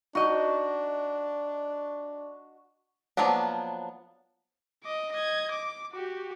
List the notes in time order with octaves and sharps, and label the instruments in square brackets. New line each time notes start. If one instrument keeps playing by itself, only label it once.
[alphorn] D4 [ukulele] D#4 D#5 [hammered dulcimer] F#4
[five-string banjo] F3 F#3 A#3 B3 D4
[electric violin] D#5 D6
D#5 G#6
D6
F#4 G4